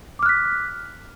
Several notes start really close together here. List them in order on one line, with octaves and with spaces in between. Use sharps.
D6 F6 F#6 B6